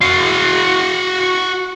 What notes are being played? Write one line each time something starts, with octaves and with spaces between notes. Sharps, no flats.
F#4 F5